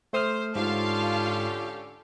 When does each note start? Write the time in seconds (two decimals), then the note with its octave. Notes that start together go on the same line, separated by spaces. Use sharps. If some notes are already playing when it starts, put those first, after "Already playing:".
0.13 A3 C5 D#6 F6
0.56 G#2 D3 C#4 F4 G4 F5 A5